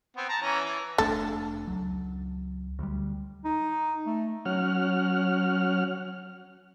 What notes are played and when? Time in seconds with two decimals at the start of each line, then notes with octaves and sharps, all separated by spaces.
0.17 B3 C4
0.29 A5 A#5
0.41 E3 C#4 A#5
0.65 E3
0.98 F1 A3 D4 A4
1.67 C#2 F#3
2.79 D2 G3
3.45 D#4
4.06 A3
4.45 F#3 C#4 F#5 F6